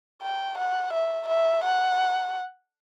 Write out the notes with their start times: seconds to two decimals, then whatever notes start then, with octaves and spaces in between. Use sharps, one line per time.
0.22 G5
0.57 F#5
0.93 E5
1.28 E5
1.64 F#5